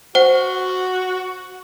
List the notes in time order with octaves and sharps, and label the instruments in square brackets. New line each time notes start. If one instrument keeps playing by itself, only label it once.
[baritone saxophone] F#4 [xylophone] C5 F#5